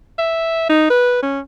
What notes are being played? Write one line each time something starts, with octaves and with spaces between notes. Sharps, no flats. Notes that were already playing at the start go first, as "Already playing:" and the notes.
E5
D#4
B4
C#4